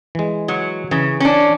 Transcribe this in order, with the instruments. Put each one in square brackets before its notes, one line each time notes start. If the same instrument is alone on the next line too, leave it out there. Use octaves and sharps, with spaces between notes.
[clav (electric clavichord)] E3 G#3
[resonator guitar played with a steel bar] F#3
[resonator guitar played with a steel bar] C#3 [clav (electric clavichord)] E3
[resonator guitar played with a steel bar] C#4 D4